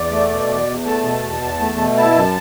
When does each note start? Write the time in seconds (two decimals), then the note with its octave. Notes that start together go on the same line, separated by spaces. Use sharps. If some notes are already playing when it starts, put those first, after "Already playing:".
Already playing: E2 D5
0.11 A3
0.30 B2
0.49 E2
0.67 E2
0.85 A3 A5
1.04 B2
1.23 E2
1.41 E2
1.61 A3
1.78 B2
1.97 E4 A5
2.15 F#2